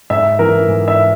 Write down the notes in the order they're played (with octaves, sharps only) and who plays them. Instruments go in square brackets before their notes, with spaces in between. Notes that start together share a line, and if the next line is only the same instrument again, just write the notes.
[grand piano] G#2 E5
E3 A#4
G#2
E5